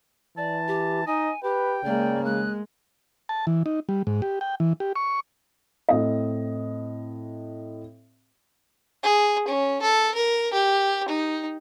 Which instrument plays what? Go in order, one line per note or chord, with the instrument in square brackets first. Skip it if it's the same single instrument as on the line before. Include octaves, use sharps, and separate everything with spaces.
[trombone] E3 [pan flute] D5 [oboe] A5
[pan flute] G4
[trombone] D#4 [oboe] D#5 [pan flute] G#5
[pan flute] G4 [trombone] B4 [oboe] G5
[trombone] C#3 [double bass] G#3 A#3 [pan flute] D5
[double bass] G#3 [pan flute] F#6
[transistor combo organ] A5
E3
D#4
G3
G#2
G4
G5
E3
G4
C#6
[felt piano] A2 C4 D#5
[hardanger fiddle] G#4
C#4
A4
A#4
G4
D#4